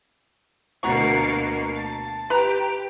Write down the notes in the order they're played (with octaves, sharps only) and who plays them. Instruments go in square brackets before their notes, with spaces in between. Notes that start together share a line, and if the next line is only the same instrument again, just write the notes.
[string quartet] D2 B2 A#3 [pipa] F#4 A#5 C#6
[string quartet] A5
[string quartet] G4 [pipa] B4 A#5